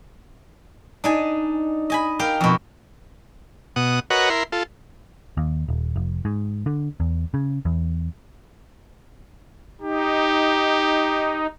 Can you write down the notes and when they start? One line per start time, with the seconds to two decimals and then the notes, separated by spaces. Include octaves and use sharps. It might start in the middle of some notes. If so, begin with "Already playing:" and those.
1.04 D4 D#4 G#5
1.90 D#5 G#5 B5
2.19 G4 A#4 F5 G5
2.41 F2 B2
3.76 B2 F#5 D#6
4.10 F#4 A#4 B4 C#5 D#5 F#5
4.30 E4 A#4 C6
4.52 F4 A4
5.37 D#2
5.68 D#1
5.96 F1
6.25 G#2
6.66 D3
7.00 E2
7.34 C#3
7.65 E2
9.81 D#4 G4